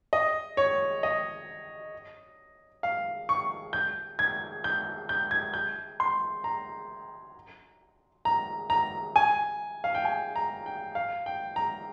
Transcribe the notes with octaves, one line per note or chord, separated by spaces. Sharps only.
D#5
C#5
D#5
F5
C#6
G6
G#6
G6
G6
G#6
G6
C6
A#5
A#5
A#5
G#5
F5
G5
G#5
A#5
G5
F5
G5
A#5